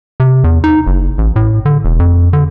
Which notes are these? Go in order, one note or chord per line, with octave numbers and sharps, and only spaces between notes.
C3
E2
D#4
F#1
A1
A2
D3
E1
F2
D3